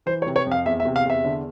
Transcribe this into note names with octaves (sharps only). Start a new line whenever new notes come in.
E3 C5
C#5
C3
C#5
F2
F5
E2 E5
E5
C3
F5
E2 E5
D3